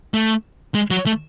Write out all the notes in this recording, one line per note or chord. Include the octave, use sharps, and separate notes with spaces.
A3
G#3
F#3
A3